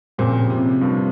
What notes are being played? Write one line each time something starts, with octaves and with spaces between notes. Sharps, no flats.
A#2 C#3 F3 C4 G4 C5
C3
G2 F3 A#3 F4